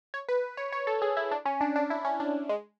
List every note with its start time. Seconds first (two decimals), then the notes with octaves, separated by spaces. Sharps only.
0.14 C#5
0.29 B4
0.57 C#5
0.72 C#5
0.87 A4
1.02 G#4
1.17 E4
1.31 D4
1.46 C#4
1.61 D4
1.76 D4
1.90 E4
2.05 C#4
2.20 D4
2.49 G#3